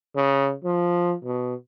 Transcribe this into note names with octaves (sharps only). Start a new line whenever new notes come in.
C#3
F3
B2